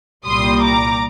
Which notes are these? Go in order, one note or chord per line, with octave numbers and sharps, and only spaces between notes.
C2 A#2 G3 C6 D#6
A#5 D6